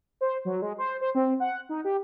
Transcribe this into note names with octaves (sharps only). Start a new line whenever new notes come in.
C5
F#3
G#3
C5
C5
C4
F#5
D#4
G4